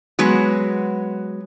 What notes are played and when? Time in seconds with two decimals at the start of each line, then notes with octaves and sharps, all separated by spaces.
0.19 F#3 G#3 B3